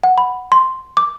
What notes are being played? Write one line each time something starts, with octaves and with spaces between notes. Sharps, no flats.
F#5
B5
C6
D6